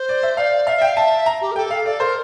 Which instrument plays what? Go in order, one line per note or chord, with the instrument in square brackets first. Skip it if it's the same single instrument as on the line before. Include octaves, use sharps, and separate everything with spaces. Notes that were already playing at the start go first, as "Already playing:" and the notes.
Already playing: [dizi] C5
[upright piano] D5
E5
[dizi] D5 [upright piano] F5
[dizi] E5 [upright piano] F5
[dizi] E5 [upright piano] G5
[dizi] F5
[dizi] E5 [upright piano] A5
[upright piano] A#5
[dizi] G4
A#4
[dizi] A4 [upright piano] G5
[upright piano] F5
[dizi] A4 [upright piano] D5
[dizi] A#4 [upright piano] C5